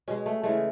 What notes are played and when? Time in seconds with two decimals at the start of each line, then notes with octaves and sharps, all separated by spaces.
0.08 B2 G#3 C#4
0.26 A3
0.43 C#3 E3 G#3 A3